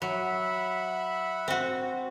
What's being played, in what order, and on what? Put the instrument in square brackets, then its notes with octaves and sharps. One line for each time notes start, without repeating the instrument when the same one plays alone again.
[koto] F#3 [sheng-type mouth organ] E5 F#5 B5
[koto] C4 F#4